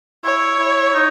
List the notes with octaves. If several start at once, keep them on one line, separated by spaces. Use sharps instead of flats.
E4 C#5
E4
D#4